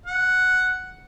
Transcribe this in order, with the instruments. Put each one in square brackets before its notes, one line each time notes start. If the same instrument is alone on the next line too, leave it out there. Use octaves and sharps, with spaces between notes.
[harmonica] F#5